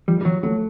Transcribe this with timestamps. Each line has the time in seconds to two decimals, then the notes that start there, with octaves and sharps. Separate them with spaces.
0.08 F3 G3
0.21 G3
0.25 F3 F#3
0.43 F#3 A3